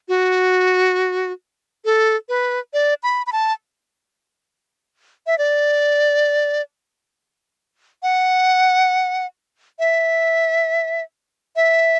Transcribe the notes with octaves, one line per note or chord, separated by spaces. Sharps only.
F#4
A4
B4
D5
B5
B5
A5
E5
D5
F#5
E5
E5